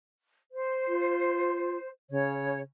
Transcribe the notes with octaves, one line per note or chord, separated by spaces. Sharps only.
C5
F4
C#3 C#5